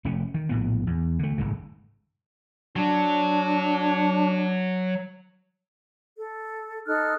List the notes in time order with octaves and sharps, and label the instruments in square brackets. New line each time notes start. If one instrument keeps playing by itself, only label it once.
[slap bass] F1 A3 C#4
D#3
A#1 A2 B3
E2
D3 A3
D#1 F2 G#2 C#3
[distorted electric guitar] F#3 [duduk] D4
[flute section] A4
D#4 A4 F6 F#6